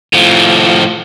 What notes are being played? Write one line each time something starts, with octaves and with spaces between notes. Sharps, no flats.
A2 F3